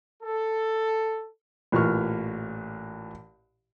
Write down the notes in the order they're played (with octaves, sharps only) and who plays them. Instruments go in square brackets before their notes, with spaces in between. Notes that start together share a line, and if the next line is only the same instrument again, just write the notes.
[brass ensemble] A4
[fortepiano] A1 A#2 E3 C#6 F6